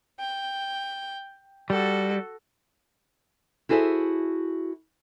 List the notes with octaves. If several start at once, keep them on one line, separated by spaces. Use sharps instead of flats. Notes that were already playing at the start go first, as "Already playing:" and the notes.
G5
G3 F#4 A4
E4 F#4 G#4 A4 C5 E5